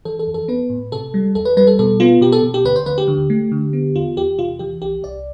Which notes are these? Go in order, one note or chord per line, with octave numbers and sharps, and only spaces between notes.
E3 A4
A4
F2
A4
B3 B4
A2
C3 A4
G3
E2 A4
B4
G3 B4
A4
B2 A4
B3 F4
B2 G4
A4
B2
G4
D2 B4
C5
D2 B4
G4
D3
A3
D3
B3
E2 F4
E2 G4
C3 F4
E3 G4
C2 G4
C2 D5